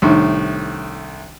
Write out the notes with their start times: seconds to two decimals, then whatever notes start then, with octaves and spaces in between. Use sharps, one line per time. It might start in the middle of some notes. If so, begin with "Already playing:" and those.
0.02 C2 A2 D#3 D4 D#4